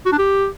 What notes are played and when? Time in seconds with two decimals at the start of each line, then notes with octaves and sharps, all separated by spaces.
0.06 F#4
0.12 D4
0.18 G4